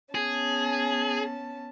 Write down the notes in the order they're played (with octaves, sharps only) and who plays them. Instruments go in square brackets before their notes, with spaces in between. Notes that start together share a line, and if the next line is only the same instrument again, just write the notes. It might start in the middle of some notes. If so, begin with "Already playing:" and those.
[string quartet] B3 C#4 A5 [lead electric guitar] G#4